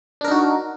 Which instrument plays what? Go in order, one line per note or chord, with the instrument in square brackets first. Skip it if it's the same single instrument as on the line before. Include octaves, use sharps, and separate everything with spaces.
[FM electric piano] D4
A#4
D#4
F#4